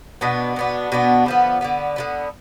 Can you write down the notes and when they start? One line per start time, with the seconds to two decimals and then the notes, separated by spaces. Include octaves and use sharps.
0.21 B2 B3 D4
0.56 B2 B3 D4
0.92 B2 B3 D4
1.26 D3 F3 B3
1.61 D3 F3 B3
1.96 D3 F3 B3